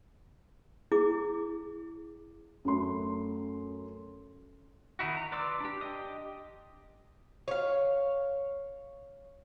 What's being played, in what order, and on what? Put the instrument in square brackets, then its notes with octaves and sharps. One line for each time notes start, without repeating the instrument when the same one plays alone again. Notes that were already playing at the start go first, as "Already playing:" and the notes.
[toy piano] E4 G#4 D6
[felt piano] F#2 A3 C6
[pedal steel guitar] D#3 D#4 E4 F#4
A#5
B4 D5 C6 D6 E6
D4 G4
G4 D#5 D#6
[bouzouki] C#5 F5